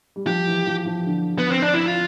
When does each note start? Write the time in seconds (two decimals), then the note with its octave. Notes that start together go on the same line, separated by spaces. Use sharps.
0.16 G3
0.27 F3 G4
0.46 E3
0.66 F3
0.86 F3
1.06 D3
1.39 B3
1.50 C4
1.62 D4
1.74 E4
1.86 F4